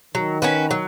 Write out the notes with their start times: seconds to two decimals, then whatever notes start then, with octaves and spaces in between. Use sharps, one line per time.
0.14 D#3 F#3
0.42 C#4 F#4 B4
0.71 F#3